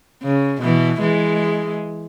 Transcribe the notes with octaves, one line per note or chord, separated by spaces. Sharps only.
C#3
B2 E3
E3 G#3